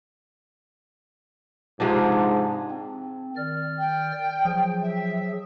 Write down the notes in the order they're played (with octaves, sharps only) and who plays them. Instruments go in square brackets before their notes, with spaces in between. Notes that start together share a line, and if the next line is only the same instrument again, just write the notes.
[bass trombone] G#2 [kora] C3 F3 D4
[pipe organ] C4
D#3 D5 F6
[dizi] G5
[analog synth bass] F3 [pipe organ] F#3 G#4
[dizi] E5